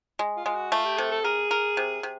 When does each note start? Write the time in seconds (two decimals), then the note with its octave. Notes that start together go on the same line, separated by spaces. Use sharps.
0.19 G#3
0.37 F4
0.46 G#3
0.55 F#4
0.72 A3 F4
0.85 G4
0.98 C3 A4
1.12 A4
1.24 G#4 A#4
1.51 A#4
1.77 C3
2.03 C3